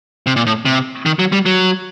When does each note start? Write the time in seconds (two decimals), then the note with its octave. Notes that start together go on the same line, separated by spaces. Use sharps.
0.27 C3
0.36 A#2
0.46 A2
0.65 C3
1.06 D#3
1.19 F#3
1.32 G3
1.46 F#3